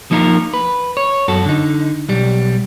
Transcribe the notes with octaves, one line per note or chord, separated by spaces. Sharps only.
F3 A#3 D#4 F4 A#4
B4
C#5
F#2 F#4 A4
D3 D#4
B1 G3